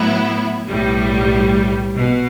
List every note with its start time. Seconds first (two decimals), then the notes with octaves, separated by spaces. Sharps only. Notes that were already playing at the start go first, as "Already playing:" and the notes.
Already playing: A2 F#3 B3 E4
0.68 B1 A2 G3
1.98 B2